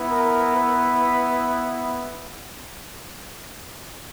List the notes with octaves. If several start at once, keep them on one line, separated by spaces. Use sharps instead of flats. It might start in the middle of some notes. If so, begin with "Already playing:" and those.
Already playing: B3 E4
A#4
B4